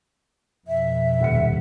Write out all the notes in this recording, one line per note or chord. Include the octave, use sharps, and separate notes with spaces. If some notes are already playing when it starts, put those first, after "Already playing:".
F2 B2 E5
D#1 F#5 C#7